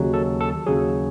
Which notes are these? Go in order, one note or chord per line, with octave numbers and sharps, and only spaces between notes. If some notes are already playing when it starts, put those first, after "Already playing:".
Already playing: D#2 C#3 F#3
A4
A4
D#2 C#3 F#3 G#4